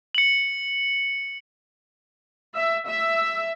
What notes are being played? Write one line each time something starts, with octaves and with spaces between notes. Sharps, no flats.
C#7 F#7
E5
E5